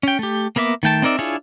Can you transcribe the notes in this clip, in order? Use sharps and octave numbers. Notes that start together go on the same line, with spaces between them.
C#4 G5
A3 G4
A#3 B3 A#4 E5 D6
D#3 A3 G5 A5
C4 D#4 A#4 D5 E5
D4 E4 F4 G#4 C#5